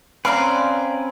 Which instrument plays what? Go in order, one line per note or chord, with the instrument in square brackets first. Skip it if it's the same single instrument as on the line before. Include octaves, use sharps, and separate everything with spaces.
[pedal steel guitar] C4 C#4 B4 [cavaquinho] D5 F5 A#5 [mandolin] C6